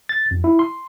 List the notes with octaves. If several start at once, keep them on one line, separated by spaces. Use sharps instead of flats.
A6
F2
E4
C6